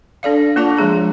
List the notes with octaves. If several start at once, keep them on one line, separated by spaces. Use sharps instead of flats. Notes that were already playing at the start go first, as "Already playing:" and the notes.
D4 A4 D5 F5
A#3 D4 F4 D5 A5 D6
F3 G#3 G#4 A#5